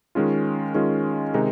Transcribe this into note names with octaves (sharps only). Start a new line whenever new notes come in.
D#3 G#3 C#4 F4
D#3 G#3 C#4 F4
C3 D#3 G#3 D#4